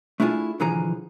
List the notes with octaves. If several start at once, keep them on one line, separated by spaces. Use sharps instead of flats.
A3 D4 E4 F4 G#4
B1 D3 E3 F3 G#4 A#5